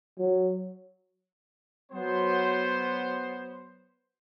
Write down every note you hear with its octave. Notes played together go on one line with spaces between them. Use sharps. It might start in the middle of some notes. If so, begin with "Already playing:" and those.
F#3
F#3 B3 C5